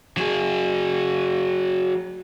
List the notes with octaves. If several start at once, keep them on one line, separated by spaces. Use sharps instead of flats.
F#3 G#4